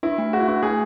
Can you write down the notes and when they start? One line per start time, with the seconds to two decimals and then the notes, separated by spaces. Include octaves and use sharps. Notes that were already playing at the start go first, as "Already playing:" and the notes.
0.03 D4 E4
0.18 A3
0.33 F#4 G#4
0.40 E4
0.48 D4 F#4
0.63 A3 G#4